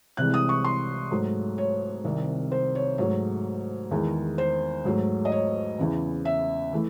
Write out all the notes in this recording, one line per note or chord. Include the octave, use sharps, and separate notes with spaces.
C2 C3 E3 G#3 F#6
D#6
C#6
C6
G#2 F#3 A3
C#5
C2 C3 D#3
C5
C#5
G#2 F#3 A3 C#5
E2 D#3 G#3
C5
G#2 F#3 A3
D#5
C#5
E2 C#3 E3
E5
E3 A3